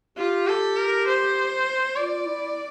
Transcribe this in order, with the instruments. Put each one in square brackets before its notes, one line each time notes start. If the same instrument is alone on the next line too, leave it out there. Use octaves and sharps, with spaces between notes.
[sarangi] F4 [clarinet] G4
[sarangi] A4
A#4
C5
[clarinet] F4 [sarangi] D5
[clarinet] E4